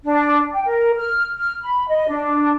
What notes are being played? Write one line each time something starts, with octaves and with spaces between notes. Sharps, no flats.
D4
G5
A#4
F6
F6
B5
D#5
D4